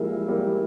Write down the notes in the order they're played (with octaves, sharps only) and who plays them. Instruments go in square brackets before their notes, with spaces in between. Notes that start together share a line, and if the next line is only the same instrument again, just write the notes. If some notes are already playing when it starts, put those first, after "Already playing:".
Already playing: [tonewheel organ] F3 G#3 E4 [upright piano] G3 A#3
[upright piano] G3 A#3